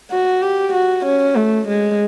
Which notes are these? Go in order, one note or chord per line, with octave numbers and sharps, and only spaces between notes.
F#4
G4
F#4
C#4
A3
G#3